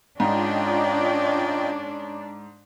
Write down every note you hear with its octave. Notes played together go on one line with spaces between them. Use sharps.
G#2 C#4 D4 F4 D5 D#5 G5